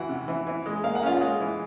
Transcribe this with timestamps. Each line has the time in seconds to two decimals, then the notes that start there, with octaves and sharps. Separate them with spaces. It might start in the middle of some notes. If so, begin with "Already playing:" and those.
Already playing: E3 F#4 F#5
0.09 C3
0.28 E3
0.47 E3
0.66 G#3
0.84 A#3 F5
0.95 F#5
1.02 C#4 F4 F5
1.21 G#3
1.40 E3